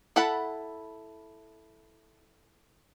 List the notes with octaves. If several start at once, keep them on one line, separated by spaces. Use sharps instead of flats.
E4 A4 F#5 A5 B5